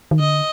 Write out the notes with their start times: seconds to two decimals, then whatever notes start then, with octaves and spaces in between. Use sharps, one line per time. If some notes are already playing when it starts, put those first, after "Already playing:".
0.11 D#3
0.20 D3 D#5